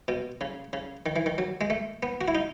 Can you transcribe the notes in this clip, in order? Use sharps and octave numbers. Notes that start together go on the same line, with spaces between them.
B2
C#3
C#3
D#3
E3
D#3
F#3
G#3
A3
B3
F#4
E4
D#4